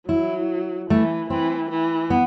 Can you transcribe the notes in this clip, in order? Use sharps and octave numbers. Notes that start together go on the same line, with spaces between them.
F#3 E4
E3 A3
E3 C4
E3
B3